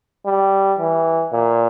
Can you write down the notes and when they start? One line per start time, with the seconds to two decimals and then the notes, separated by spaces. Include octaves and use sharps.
0.26 G3
0.79 E3
1.32 A#2